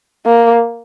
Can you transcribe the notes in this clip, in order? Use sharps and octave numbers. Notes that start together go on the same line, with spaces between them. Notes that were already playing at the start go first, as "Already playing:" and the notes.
A#3